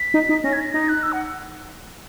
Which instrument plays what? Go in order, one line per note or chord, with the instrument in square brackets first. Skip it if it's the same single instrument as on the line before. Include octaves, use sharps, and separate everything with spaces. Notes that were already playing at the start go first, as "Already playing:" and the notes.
Already playing: [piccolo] B6
[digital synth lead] D#4
D#4
[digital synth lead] C#4 [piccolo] A#6
[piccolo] G#6
A#6
[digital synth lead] D#4 [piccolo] A#6
[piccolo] F#6
E6
F#5